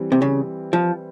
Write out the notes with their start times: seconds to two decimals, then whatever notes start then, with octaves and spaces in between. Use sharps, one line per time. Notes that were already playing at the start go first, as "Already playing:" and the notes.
Already playing: E3 G3 C4
0.12 C3
0.22 C#3
0.73 F3